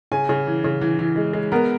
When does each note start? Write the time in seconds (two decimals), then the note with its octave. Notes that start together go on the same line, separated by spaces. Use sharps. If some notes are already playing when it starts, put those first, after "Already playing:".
0.12 C#3 G#5
0.29 C#3
0.47 E3
0.64 C#3
0.81 E3
0.99 E3
1.16 G#3
1.33 G#3
1.52 B3 A#4